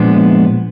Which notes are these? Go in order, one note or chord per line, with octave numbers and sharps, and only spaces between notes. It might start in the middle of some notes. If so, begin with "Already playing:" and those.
Already playing: A#2 F3 G#3 B3 D4